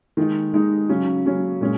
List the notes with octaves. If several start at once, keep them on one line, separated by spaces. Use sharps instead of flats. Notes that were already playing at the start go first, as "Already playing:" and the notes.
D#3 G#3 D#4
D#3 G#3 D#4
C#3 F#3 C#4
C#3 F#3 C#4
A#2 G#3 C#4